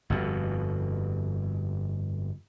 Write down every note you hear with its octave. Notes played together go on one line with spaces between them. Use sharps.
G1 F2 G#2 B2